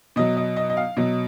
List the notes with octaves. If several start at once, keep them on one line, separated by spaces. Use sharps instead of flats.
B2 F#3 D#5
D#5
D#5
D#5
F5
B2 F#3 D#5